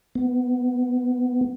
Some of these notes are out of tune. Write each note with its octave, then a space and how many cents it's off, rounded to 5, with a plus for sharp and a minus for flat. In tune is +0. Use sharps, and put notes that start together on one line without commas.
B3 +10